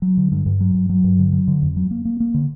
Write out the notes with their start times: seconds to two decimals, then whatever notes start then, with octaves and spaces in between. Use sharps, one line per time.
0.02 F#3
0.17 D3
0.32 G2
0.46 G2
0.60 F#3
0.75 G2
0.89 F#3
1.04 G2
1.19 D3
1.33 F#3
1.48 D3
1.62 F2
1.77 F#3
1.91 A#3
2.05 A#3
2.20 A#3
2.34 D3